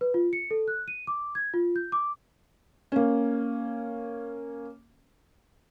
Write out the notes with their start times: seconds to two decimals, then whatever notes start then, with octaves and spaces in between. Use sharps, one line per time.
0.01 B4
0.14 F4
0.33 C#7
0.51 A4
0.68 F#6
0.88 D#7
1.07 D6
1.35 G#6
1.54 F4
1.76 G6
1.92 D6
2.92 A#3 C#4